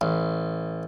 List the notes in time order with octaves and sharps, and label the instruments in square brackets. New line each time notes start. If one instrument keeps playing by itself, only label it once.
[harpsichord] A1